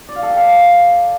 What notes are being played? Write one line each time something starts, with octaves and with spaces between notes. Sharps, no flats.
D5
F5
A4
G5
F5